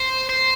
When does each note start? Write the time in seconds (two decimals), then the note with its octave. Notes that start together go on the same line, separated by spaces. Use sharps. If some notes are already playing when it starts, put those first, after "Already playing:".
Already playing: C5
0.29 C5